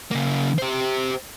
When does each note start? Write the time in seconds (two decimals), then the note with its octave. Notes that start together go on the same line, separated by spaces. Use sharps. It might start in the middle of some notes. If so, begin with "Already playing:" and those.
0.11 C#3 A#3
0.58 G4 C5